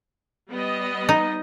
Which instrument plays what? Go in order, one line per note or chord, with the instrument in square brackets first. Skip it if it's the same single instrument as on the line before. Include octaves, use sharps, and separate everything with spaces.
[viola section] G3 B3 D#5
[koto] D#4